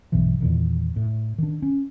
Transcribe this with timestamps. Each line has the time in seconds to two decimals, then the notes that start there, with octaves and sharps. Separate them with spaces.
0.12 B1 G2 B2 E3
0.40 E2 A#2 D#3
0.96 A2
1.38 D#3 D4
1.62 C#4